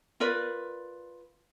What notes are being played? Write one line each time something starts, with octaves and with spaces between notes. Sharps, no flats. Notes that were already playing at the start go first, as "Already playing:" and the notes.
F4 A#4 B4 D5